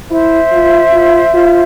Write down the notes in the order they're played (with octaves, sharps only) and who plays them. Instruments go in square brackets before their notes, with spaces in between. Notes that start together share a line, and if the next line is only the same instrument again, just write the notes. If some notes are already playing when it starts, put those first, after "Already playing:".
[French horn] E4 [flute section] C5 E5
[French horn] F4
F4
F4